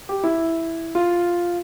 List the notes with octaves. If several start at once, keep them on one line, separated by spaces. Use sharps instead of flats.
G4
E4
F4